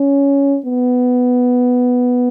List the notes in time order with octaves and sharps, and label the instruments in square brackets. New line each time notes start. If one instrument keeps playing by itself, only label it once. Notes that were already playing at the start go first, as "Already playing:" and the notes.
Already playing: [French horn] C#4
B3